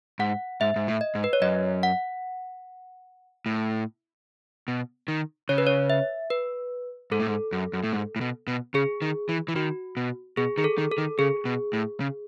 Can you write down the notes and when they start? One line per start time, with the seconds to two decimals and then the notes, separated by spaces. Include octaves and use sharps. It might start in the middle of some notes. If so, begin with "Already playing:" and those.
0.19 G#2 F#5
0.61 G#2 E5
0.76 G#2
0.88 A2
1.01 D#5
1.15 G#2
1.24 B4
1.33 C#5
1.42 F#2 D#5
1.83 F#5
3.46 A2
4.68 B2
5.08 D#3
5.49 C#3 C#5
5.58 B4
5.67 C#5
5.90 E5
6.30 B4
7.11 G#2 A4
7.20 A2
7.27 G#2
7.52 F#2
7.73 F#2
7.84 A2
7.93 G#2
8.16 A2
8.21 B2
8.47 B2
8.74 C#3 G#4
9.02 D#3
9.29 E3
9.48 E3
9.56 D#3 F#4
9.97 B2
10.37 B2 G#4
10.58 D#3 G#4
10.64 A4
10.78 D#3
10.92 A4
10.98 D#3
11.19 C#3 G#4
11.45 B2
11.73 A2
12.00 C#3